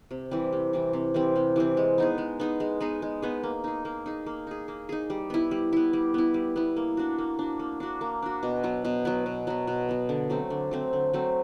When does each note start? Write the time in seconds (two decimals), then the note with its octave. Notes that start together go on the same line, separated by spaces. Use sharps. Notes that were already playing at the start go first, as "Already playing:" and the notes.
0.11 C3
0.31 E3 G3 C4
0.53 C3
0.73 E3 G3 C4
0.93 C3
1.14 E3 G3 C4
1.36 C3
1.56 E3 G3 C4
1.77 G#3
1.98 B3 D#4 G#4
2.18 G#3
2.40 B3 D#4 G#4
2.60 G#3
2.80 B3 D#4 G#4
3.02 G#3
3.22 B3 D#4 G#4
3.43 A#3
3.64 D#4 G#4
3.85 A#3
4.06 D#4 G#4
4.26 A#3
4.47 D#4 G#4
4.68 A#3
4.89 D#4 G#4
5.10 G3
5.30 B3 E4
5.51 G3
5.73 B3 E4
5.93 G3
6.14 B3 E4
6.34 G3
6.56 B3 E4
6.76 A#3
6.97 D4 F#4
7.18 A#3
7.39 D4 F#4
7.59 A#3
7.80 D4 F#4
8.01 A#3
8.22 D4 F#4
8.43 B2
8.64 F#3 B3
8.85 B2
9.05 F#3 B3
9.26 B2
9.47 F#3 B3
9.67 B2
9.89 F#3 B3
10.09 D3
10.30 F#3 A3 C4
10.50 D3
10.71 F#3 A3 C4
10.93 D3
11.14 F#3 A3 C4